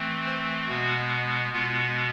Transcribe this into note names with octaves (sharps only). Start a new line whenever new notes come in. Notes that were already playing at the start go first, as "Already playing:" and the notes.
Already playing: E3 A3 C4
C5
B2 G#3 B3 F#4
B2 G#3 B3 F4